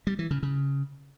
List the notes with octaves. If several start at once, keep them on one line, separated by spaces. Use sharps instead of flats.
G3
E3
C#3
C#3